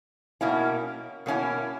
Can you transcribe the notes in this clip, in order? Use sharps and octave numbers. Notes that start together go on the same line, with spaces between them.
B2 A#3 C#4 E4
B2 A#3 C#4 E4